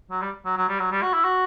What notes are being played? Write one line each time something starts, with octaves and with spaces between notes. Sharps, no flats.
F#3
G3
F#3
F#3
G3
F#3
G3
F#4
E4
F#4